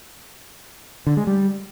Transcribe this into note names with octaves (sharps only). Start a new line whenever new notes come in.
D3
G#3
G3